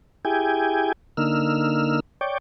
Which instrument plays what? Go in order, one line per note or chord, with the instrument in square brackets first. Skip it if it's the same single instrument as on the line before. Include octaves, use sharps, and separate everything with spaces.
[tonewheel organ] E4 G4 G#4 G5 G#5
D3 A#3 D#4 E6 F6
C#5 D5 G5